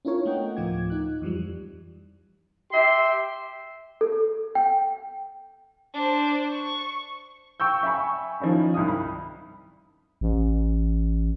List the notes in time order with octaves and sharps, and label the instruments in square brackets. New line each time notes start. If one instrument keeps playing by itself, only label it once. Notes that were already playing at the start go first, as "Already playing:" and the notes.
[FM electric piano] C#4 D4 E4 F4 A#4 C#5
A3 B3 A#4 D#5 F#5 G5
D2 A2 F3 F4 D6 G#6
D#4 F#6
F2 E3 F3 G3
[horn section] G4 E5 C6
[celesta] A4
G5
[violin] D4 C5
C#6
[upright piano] G5 C#6 E6 G6
E5 G5 G#5 B5 C#6
D#3 F3 C#4 D#4 E4
C2 G2 D#3 D#6
B5
[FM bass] A1